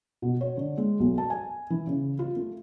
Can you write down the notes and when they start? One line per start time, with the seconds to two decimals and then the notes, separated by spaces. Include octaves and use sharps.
0.22 B2
0.41 C#5
0.57 D3
0.77 G#3
1.00 B1
1.18 A5
1.30 G#5
1.70 E3
1.87 C#3
2.19 F4
2.36 A3